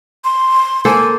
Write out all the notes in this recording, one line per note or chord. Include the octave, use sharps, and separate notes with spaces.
C6
A#3 A4 C5 G#5